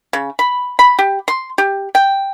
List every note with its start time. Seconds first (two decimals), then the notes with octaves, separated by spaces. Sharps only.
0.13 C#3
0.39 B5
0.79 B5
0.99 G4
1.28 C6
1.58 G4
1.95 G5